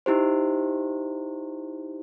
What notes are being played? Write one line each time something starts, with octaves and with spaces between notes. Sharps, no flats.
D#4 E4 G4 C5